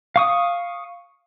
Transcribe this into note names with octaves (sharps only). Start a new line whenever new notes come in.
F5 C#6 D#6